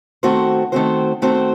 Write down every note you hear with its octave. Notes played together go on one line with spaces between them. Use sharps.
D#3 A3 C4 F#4 C5
D#3 A3 C4 F#4 C5
D#3 A3 C4 F#4 C5